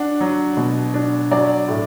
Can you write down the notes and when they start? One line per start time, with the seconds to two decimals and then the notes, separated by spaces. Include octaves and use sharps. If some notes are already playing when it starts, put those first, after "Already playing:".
Already playing: D4 F#5
0.20 F#3
0.57 B2
0.94 D4
1.31 F#3 D5
1.68 A2